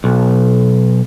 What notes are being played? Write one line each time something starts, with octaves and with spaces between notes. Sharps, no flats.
B1